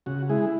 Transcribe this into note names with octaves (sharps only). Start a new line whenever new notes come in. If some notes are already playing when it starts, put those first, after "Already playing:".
C#3 F#4
G#3 E4 G#4